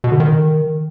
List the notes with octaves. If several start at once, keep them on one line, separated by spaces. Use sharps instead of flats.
B2
D3
D#3